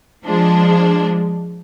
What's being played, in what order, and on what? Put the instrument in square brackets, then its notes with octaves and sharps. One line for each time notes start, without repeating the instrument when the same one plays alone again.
[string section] F3 G#3 D4